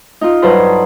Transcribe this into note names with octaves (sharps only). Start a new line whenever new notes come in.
D#4 F4
G2 F#3 A4 B4 C5 A#5